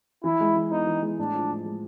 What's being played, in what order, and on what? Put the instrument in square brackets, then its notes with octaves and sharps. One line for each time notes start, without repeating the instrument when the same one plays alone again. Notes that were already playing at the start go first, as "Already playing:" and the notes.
[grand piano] E3 [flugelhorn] E4
[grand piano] G#3
E3
[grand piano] B3 [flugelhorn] D#4
[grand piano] E3
G#3
[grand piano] A2 [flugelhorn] D4
[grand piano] F3
A2
G#3